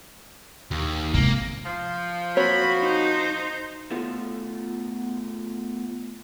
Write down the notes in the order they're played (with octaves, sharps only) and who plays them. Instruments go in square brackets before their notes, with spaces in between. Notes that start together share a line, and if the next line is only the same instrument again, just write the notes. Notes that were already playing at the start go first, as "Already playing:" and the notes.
[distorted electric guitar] D#2
[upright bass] G#2 C3 [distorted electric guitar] A#3
[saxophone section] F3
[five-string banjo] A#3 C4 C#5 [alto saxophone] F#4 [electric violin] B5
[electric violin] D#4 C5
[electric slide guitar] A3 B3 F4 A4